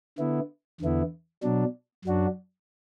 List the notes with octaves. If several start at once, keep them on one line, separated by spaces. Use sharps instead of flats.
D3 B3 E4
E2 D3 B3 E4
B2 F#3 D4
F#2 F#3 D4 F#4